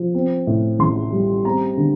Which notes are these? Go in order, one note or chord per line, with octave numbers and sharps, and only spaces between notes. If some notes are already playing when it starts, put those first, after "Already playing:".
Already playing: F3
C4
A2
A1 C6
G3
C4 A#5
D3